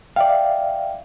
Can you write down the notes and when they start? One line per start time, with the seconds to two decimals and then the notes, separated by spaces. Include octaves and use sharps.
0.16 D5 E5 F5 G5